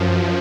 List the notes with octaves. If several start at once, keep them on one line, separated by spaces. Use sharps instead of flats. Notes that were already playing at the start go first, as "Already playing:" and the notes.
Already playing: F#2 F3